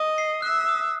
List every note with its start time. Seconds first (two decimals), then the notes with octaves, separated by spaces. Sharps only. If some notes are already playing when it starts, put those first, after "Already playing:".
Already playing: D#5 D#6
0.18 C7
0.42 E5 F#6
0.69 D#6